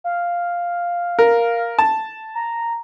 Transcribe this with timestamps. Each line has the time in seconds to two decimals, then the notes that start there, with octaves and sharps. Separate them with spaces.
0.04 F5
1.19 A#4
1.79 A5
2.35 A#5